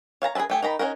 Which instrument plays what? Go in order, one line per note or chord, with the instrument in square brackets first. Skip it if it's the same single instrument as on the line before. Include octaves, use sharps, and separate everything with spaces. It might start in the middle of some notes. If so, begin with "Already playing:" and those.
[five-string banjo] C#5 F5 A5 A#5
G#4 A#4 B4 E5 A5
A3 G4 G#4
D#3 D#4 A#5 B5
C#4 D#4 F#4 A#4